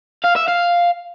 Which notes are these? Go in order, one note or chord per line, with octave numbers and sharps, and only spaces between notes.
F5
E5
F5